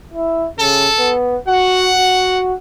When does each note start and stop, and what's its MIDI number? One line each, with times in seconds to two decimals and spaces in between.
0.13 0.48 64
0.59 0.87 49
0.59 1.13 69
0.99 1.37 59
1.48 1.93 66
1.48 2.39 78
1.98 2.53 66